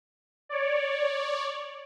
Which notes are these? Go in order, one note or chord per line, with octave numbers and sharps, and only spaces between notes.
C#5 D5